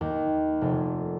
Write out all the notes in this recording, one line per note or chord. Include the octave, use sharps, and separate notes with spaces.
D#2
F1